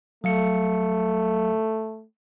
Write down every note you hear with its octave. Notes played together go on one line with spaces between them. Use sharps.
F#3 A3 F5 C#7